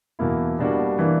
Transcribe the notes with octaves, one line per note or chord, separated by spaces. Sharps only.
E2 B2 A#3 E4
B2 G3 A#3 D4 F#4
E3 A#3 D4